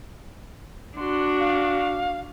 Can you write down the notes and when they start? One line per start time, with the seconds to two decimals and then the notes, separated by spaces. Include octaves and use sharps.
0.97 D4 F#4 C6
1.39 F5